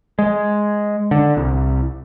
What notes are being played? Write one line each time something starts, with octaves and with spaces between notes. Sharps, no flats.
G#3
D3
C2